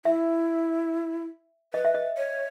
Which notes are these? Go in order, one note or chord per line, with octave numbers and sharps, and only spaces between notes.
E4 E5
B4 D#5
E5
D#5
C#5